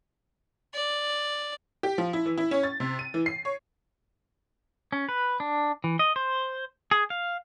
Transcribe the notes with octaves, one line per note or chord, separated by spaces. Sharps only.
D5
G4
F3
E4
E3
E4
C#4
A6
C3
D#7
E3
C7
C#5
C#4
B4
D4
E3
D#5
C5
G#4
F5